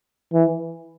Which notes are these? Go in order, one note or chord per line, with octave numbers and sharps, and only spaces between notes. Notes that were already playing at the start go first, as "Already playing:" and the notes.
E3